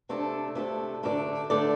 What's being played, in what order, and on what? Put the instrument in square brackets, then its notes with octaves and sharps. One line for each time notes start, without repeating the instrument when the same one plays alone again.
[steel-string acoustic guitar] C3 A3 D4 A4
C3 A3 D4 A4
D3 A3 D4 A4 D5
D3 A3 D4 A4 D5